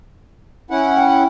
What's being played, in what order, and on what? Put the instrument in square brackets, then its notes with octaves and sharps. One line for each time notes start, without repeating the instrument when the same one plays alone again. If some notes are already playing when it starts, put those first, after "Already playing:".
[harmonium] C#4 E4 F#5
[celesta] G5